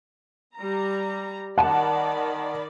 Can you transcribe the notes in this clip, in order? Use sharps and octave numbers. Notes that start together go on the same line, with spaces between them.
G3 A#5
D#3 D5 F#5 A5 B5